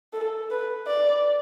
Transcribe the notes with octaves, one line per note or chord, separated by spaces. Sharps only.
A4
B4
D5